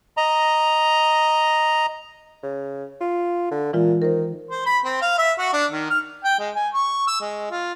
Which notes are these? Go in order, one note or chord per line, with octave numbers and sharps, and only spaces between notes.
D#5 A#5
C#3
F4
D3
A#2 E3 G#3 F4
D#3 A#4 C5
C5
B5
C4
F5
E5
F#4
D4
D#3
F6
G5
G#3
G#5
C#6
E6
G#3
F4